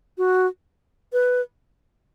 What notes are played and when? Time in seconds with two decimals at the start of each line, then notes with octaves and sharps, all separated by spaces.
0.18 F#4
1.13 B4